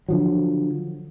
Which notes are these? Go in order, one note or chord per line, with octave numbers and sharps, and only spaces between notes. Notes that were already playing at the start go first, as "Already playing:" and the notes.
D3 F3 F#3